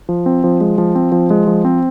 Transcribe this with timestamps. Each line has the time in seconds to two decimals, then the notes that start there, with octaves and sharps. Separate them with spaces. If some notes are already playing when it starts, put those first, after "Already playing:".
0.09 F3
0.26 C4
0.44 F3
0.61 G#3
0.78 F3
0.95 C4
1.12 F3
1.30 G#3
1.47 F3
1.65 C4